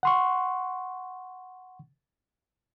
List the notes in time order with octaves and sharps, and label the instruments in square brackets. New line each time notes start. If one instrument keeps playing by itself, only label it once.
[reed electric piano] F#5 C6 C#6